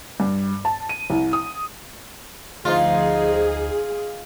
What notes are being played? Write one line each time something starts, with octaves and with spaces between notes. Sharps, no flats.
G2
A5
D#7
C2
D#6
D2 F3 D#4 F4 G#4 C5